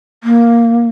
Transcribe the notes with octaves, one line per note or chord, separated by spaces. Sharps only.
A#3